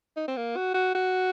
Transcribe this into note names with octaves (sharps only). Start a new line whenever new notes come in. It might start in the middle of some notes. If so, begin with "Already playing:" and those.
D#4
C4
A#3
F#4
F#4
F#4